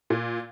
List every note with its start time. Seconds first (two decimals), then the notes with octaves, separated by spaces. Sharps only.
0.10 A#2